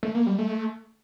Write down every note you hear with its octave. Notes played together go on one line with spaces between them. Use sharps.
A3
A#3
G3
A3